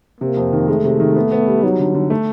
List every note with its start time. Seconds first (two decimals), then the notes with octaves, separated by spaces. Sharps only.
0.20 C3 A#3
0.37 F2
0.53 D#3
0.68 G#3 A3
0.84 C3
1.00 D#3
1.16 B3
1.32 B3
1.47 G3
1.63 F#3 D#4
1.80 D3
1.95 D3
2.10 A3